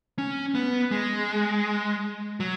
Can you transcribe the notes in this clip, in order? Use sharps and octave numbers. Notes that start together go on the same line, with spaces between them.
C#4
B3
G#3
F#3